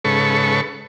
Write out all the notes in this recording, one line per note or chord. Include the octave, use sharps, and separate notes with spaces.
G#2 C#3 A4 B4 C#6